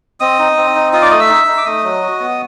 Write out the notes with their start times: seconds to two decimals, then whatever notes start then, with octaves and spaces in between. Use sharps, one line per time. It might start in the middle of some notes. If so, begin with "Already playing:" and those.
0.20 C4 D#5 D#6
0.39 D#4
0.57 C4
0.75 D#4
0.93 F4 D#5 D#6
1.02 D5 D6
1.11 A3 D#5 D#6
1.20 E5 E6
1.29 D#4
1.48 D#4
1.58 D6
1.65 A3 D#5 D#6
1.83 F#3
2.01 F#4
2.20 B3